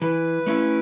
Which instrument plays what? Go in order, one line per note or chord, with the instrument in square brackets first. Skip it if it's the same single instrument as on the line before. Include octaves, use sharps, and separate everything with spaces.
[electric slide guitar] E3 [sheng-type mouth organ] B4
[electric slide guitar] A3 C#4 E4